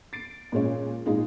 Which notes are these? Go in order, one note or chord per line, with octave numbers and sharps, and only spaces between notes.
A6 C7 D7
A#2 G#3 C#4
A#2 G#3 D#4 F4